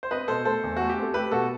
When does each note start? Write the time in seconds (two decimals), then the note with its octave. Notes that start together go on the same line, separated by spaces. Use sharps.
0.03 C5
0.11 C4 B4 D#5
0.28 B2 A4 C5
0.45 A3 A4 C5
0.63 E2
0.77 A3 F#4
0.89 G4
0.98 C4 A4
1.14 A3 G4 B4
1.31 B2 F#4 A4